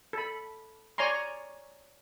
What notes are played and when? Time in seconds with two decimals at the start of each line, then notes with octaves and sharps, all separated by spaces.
0.13 A4 B5
0.98 C#5 D5 G#5 A#5 C6